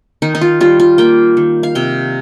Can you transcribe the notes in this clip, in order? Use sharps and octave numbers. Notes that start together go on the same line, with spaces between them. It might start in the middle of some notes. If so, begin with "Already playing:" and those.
D#3 D#4
D#4
F4
G3 F4
F4
A#3 G5
D#3
F5
C3 G5